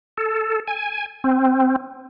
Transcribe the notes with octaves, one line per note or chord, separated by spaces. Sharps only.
A4
G#5
C4